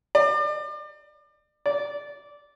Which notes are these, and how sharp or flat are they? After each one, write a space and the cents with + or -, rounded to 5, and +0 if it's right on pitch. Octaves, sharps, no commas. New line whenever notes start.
D5 +35
D5 -15